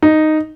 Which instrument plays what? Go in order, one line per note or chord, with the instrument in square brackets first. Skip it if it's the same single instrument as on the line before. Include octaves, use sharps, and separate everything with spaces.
[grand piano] D#4